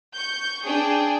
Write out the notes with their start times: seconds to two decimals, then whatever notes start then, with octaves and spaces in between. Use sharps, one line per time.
0.13 C#6 G6
0.64 D4 G#4 G5